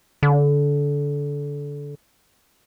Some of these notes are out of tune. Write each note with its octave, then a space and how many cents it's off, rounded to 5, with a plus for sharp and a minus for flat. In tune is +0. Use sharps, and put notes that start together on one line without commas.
D3 -25